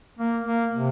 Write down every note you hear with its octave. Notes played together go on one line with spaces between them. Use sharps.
A#3
A#3
C3